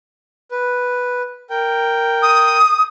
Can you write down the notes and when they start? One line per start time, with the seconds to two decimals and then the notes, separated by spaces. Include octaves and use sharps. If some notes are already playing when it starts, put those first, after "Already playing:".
0.51 B4
1.50 A#4 G5
2.22 D#6